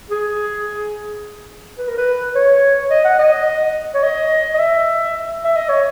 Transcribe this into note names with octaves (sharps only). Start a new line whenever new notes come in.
G#4
B4
A#4
B4
C#5
D#5
F#5
D#5
C#5
D#5
D#5
E5
E5
D#5
C#5